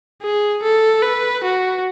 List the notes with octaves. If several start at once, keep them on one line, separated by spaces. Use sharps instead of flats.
G#4
A4
B4
F#4